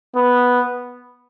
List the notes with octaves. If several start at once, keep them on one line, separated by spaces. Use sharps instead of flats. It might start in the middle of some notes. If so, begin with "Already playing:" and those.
B3